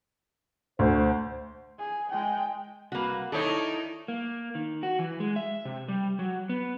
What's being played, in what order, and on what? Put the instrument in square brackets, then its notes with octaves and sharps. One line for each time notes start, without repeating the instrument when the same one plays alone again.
[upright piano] D2 [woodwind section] C5
[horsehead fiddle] G#4
G#3 G5
[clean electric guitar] C2 B4 [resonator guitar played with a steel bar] A#3 F#4
[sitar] D#3 D#4 [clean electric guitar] E4 D5 [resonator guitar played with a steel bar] A4 C#5
[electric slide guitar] A#3
D#3
F#4
E3
G#3
E5
C3
G3
F#3
B3